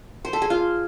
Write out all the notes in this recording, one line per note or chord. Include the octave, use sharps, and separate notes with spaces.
C5
A4
G#4
F4